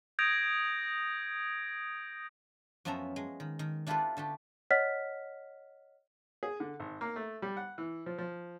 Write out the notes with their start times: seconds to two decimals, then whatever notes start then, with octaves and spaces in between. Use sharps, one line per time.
0.19 D#6 G6 G#6 A#6 D7 F7
2.85 F#2 F3 B3 C#4 E5 A#5
3.16 G#3
3.40 D#3
3.59 D#3
3.87 D4 E4 F4 G4 A4 B4
4.17 D3 A3 G4
4.71 C#5 D#5 F#5 F6 B6
6.43 G#4
6.60 D3
6.80 G#1
7.01 A#3
7.16 A3
7.42 G3
7.57 F#5
7.78 E3
8.06 F3
8.18 F3